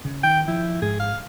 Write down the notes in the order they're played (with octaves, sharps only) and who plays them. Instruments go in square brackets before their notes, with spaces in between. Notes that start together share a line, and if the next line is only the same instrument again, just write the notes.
[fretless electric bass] C#3
[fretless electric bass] D#3 [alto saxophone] G5
[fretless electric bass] F3 [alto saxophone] E4
[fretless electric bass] G#2 [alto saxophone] G#4
[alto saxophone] F5